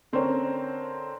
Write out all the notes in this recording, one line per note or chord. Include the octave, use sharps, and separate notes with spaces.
D3 C4 C#4 A#4 C5 C#5